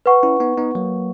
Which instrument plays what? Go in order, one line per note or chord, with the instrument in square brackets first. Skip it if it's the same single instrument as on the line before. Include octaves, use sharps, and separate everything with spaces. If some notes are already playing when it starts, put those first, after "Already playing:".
[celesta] B4 F#5 C#6
[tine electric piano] C#4 E4
B3 D#4
B3 D#4
F#3 A#3